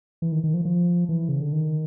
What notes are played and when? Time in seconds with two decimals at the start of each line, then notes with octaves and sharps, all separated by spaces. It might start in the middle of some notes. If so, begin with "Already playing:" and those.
0.22 E3
0.32 D#3
0.44 D#3
0.54 F3
0.65 F3
1.09 E3
1.29 C#3
1.41 D3
1.53 D#3